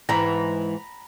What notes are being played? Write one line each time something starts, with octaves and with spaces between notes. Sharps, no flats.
G#2 E3 A#5 B5